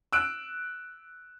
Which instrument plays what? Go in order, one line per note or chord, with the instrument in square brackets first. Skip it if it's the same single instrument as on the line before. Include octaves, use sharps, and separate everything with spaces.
[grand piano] E6 F#6 D7